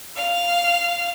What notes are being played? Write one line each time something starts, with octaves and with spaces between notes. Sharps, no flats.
F5